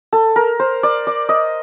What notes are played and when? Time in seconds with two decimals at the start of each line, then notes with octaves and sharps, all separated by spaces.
0.13 A4
0.36 A#4
0.59 C5
0.83 D5
1.07 D5
1.29 D#5